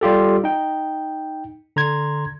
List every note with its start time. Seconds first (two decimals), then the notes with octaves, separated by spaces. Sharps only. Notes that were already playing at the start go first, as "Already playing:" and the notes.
0.01 G3 F4 G4 A4
0.44 D#4 G5
1.76 D3 A#5 C6 G#6